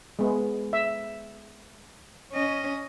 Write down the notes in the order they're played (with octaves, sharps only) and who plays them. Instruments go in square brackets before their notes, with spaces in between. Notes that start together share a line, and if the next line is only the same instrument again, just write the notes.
[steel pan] G#3 B3
E5
[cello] C#4 D#5